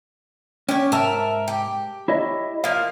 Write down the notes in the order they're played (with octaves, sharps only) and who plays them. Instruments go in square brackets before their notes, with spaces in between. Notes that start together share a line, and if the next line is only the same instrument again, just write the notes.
[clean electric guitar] C#4 [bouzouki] G4 C#5
[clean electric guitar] G#2 A5 [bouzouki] A#4 E5
[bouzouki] G4
[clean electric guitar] E4 C#5 D#5
[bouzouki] F3 A#3 [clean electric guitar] F5